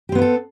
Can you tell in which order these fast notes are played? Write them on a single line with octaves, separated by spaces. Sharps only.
G4 C4 B3 E4 A4